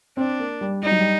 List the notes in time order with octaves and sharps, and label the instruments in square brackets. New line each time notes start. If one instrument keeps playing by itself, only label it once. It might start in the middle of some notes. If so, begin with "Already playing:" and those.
[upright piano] C4 [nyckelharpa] D4
[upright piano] A#3
G3
[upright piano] G3 [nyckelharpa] D#4
[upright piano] F#3
G3